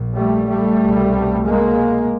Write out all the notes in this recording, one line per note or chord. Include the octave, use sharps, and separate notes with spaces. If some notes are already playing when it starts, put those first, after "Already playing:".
Already playing: A#1 A#2
G3 A3
G3 A3
C2 B2
G#3 A#3